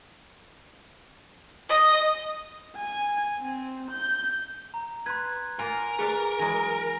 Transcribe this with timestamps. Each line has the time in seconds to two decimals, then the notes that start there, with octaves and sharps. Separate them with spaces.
1.69 D#5
2.76 G#5
3.40 C4
3.91 G6
4.74 A#5
5.06 B4 C6 F#6 G#6
5.59 A#3 F4 A#4 G#5
5.99 G#4 B4 D5 F5
6.39 E3 F#3 G#3 G#5 A#6